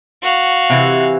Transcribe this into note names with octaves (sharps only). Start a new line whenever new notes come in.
F#4 F5
C3 E3